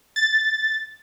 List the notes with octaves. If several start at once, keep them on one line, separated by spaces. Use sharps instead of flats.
A6